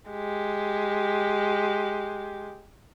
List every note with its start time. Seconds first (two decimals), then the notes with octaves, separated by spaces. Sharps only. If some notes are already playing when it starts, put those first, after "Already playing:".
0.11 G#3 G4